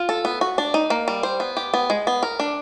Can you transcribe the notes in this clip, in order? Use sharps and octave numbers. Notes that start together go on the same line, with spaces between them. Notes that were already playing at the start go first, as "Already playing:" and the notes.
Already playing: F4
A4
B3
F#4
D4
D#4
A#3
G3
C5
B3
G4
B3
G#3
B3
A#4
D4